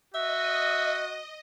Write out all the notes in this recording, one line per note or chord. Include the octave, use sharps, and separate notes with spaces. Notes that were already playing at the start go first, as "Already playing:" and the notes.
F#4 D#5 E5